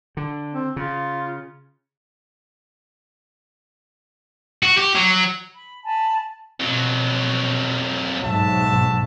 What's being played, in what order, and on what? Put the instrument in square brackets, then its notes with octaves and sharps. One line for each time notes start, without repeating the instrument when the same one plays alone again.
[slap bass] D3
[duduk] C4
[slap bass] C#3 [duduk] F4
[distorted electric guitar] F#4
G4
F#3
[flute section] B5
G#5 A5 B5
[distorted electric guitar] F2 F#3 [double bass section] B2
[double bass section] B1 G#2 [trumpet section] F#4 E5 A5